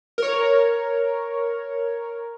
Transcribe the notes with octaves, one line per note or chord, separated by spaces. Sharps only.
A#4 C#5